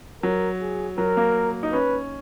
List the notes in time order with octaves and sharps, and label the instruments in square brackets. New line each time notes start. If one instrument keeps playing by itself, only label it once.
[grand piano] F#3 [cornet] A#4
[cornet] G#4
[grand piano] F#3 [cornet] A#4
[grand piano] A#3
D#4
[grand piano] C#4 [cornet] B4